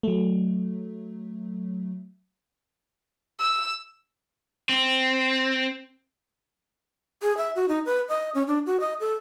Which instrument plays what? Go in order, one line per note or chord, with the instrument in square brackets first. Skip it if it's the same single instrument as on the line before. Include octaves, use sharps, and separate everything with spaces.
[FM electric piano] F#3 A3
[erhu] E6
[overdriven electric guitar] C4
[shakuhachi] G#4
E5
F#4
D#4
B4
D#5
C#4
D4
F#4
D#5
A4